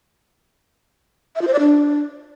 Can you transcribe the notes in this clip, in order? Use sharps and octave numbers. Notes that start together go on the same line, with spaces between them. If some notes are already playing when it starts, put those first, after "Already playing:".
E5
F4
C5
D5
D4